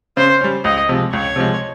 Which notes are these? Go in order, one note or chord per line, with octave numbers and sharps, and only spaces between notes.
C#3 C5
G3 C#4
C#2 D#5
C3 F3 G#3
C#2 C#5
C3 F3 G#3